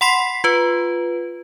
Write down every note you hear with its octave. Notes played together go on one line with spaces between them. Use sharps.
F#5 B5 C6 B6 C7
F4 B4